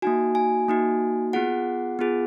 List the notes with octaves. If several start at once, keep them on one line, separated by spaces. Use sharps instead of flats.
A#3 D#4 F#4 G#5
G#5
A#3 D#4 F#4
B3 F4 G#4 F#5
B3 F4 G#4